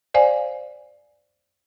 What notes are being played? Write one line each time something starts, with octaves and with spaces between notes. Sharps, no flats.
C5 D5 F5 G#5